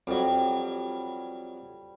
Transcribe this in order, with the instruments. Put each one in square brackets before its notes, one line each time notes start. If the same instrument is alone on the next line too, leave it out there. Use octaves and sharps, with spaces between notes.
[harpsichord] F2 F#3 [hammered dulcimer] G3